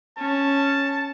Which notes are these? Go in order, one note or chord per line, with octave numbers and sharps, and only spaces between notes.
C#4 A5